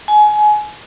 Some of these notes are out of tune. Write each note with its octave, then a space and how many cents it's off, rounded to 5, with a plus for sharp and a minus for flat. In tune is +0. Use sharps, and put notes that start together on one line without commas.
G#5 +25